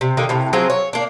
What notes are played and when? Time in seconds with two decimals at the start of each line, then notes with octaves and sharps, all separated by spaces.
0.01 C3
0.17 D3 D#3 A#3
0.29 A2 C3
0.53 F#3 C4 F4 G#4
0.70 C#5
0.93 A#3 D4